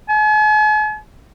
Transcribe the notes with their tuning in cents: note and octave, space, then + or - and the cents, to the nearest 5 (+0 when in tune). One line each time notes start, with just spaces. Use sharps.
G#5 +45